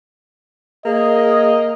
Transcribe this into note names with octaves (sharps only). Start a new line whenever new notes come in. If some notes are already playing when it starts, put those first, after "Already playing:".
A#3 G#4 D#5